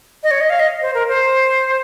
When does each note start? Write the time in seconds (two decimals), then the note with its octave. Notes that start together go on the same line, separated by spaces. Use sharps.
0.23 D#5
0.31 C#5
0.41 D#5
0.50 F5
0.60 D#5
0.82 C5
0.95 A#4
1.08 C5